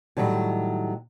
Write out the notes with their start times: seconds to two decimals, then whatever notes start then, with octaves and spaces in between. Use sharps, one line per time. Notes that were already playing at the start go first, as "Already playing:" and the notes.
0.17 A2 D#3 F#3 G3